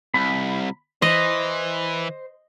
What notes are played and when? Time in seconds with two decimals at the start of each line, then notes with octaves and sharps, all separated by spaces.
0.14 C2 B5
1.02 E3 C5 D#5